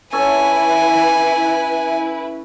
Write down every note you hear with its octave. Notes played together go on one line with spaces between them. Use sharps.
C#4 E4 A4 B4 G#5 C#6